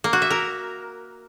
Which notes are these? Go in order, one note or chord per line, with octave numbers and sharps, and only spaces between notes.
A#3
F#4
E5
A#4